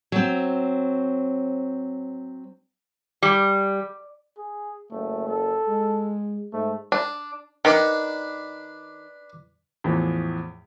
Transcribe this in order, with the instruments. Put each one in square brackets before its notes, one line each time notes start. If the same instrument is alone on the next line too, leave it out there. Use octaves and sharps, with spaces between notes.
[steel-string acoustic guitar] F#3 C4
[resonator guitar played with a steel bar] G3
[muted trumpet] G#4
[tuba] F#1 [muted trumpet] A3
[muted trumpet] A4
[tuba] G#3
[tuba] G#2 [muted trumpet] A3
[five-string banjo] D4
[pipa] D#3 [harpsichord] D4 B4
[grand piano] E2 A2 E3 F3